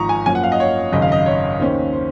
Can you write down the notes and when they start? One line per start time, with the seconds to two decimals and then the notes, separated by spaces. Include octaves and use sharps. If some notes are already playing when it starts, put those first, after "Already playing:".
Already playing: G#1 G#2 F3 A#5 C#6 D#6
0.09 G#5
0.26 F#2 F3 A#3 C#4 G#5
0.35 F#5
0.43 F5
0.52 D#5
0.60 C#5
0.92 G#1 F#2 C#3 D#5
1.02 F5
1.12 D#5
1.26 C#5
1.59 D#2 D#3 A#3 C#4 C5
1.93 C5